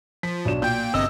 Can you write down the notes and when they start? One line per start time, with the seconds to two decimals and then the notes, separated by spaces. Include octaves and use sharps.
0.23 F3 B6
0.45 B1 D4 E7
0.62 A#2 G5 G6
0.94 G1 C3 D#5 E6